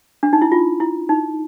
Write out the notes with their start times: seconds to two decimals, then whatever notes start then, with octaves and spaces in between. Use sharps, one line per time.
0.23 D4
0.33 D#4
0.42 E4
0.52 F4
0.80 E4
1.09 D#4